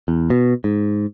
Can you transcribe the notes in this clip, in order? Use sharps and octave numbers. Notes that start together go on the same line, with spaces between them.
E2
B2
G#2